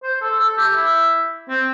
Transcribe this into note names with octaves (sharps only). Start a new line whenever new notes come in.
C5
A4
A4
G4
E4
C4